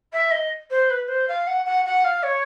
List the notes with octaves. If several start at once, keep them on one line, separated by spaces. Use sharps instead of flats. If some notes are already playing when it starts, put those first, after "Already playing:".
E5
D#5
C5
B4
C5
F5
F#5
F#5
F#5
F5
C#5